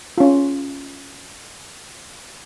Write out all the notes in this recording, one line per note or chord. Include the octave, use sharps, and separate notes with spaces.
C#4 F4